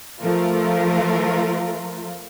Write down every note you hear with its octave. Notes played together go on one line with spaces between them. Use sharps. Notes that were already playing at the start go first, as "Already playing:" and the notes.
F3 A3 F4 A#4